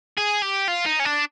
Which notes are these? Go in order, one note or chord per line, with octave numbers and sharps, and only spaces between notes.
G#4
G4
F4
D#4
C#4
D4